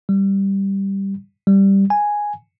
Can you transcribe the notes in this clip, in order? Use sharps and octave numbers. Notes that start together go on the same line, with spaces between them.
G3
G3
G#5